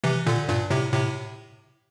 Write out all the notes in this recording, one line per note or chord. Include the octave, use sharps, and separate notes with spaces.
C3 E3
A#2 D3
G2 A#2
A2 C3
A2 C3